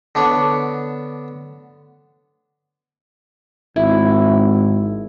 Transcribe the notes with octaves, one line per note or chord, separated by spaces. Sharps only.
D3 B3 D4 C#5
G#1 E4